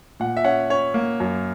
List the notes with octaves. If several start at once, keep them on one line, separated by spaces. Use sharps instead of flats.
A#2 F#5
E5
C#4 F#5
C#4 C#5
A#3
F#2